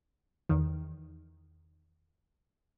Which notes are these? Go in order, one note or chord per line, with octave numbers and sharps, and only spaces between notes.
E2 D#3